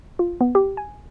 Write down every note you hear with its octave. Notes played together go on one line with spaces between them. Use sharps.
F4
B3
G4
G#5